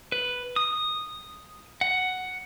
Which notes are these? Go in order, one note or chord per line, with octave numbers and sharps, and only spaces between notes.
B4
D#6
F#5